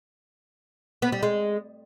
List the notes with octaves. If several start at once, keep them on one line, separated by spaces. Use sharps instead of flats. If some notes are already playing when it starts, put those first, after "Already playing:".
B3
G3
G#3